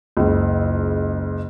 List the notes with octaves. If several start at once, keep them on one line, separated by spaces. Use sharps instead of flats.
F#1 C#2